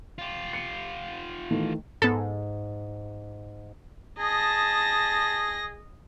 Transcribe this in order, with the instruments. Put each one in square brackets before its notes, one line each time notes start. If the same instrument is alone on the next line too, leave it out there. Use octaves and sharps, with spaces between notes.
[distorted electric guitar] F4 G4
[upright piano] C#7
D#3 E3 A3
[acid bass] G#2 [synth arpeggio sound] B3 A4
[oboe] G#4 [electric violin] D#5 A#6 [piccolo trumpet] A5